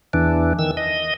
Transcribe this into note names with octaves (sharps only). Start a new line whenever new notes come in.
E2 E3 D4
D#3 E6
D#5